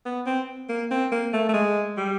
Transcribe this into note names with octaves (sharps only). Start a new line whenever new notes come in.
B3
C4
A#3
C4
A#3
A3
A3
G#3
G3